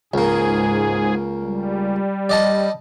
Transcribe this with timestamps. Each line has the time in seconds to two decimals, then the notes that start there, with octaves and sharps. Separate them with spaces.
0.14 C#2 G#2 A#3 G#4
1.43 G3
2.29 D5 D#5 A5